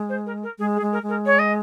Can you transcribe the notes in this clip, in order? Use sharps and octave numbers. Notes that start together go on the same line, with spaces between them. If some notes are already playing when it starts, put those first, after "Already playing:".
Already playing: G#3
C5
A#4
A#4
G#3 G#4
G#4
G#3
A#4
G#3
A#4
C#5
D#5